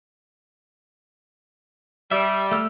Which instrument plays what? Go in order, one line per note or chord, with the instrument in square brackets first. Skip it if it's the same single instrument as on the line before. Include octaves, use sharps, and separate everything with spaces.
[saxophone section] G3 [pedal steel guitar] E5
[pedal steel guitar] A3 E6 F6